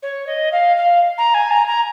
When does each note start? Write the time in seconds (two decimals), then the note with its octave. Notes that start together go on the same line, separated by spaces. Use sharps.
0.02 C#5
0.27 D#5
0.52 F5
0.77 F5
1.18 A#5
1.34 G#5
1.51 A#5
1.67 A#5